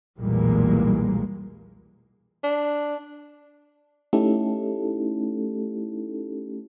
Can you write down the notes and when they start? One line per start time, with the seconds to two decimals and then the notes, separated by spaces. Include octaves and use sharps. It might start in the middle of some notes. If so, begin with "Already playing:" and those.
0.19 B1 E2 A#2 G3 G#3 A#3
2.44 D4
4.13 A3 C#4 D#4 E4 G4 A4